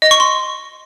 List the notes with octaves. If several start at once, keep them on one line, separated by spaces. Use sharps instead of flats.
D#5
C#6
C6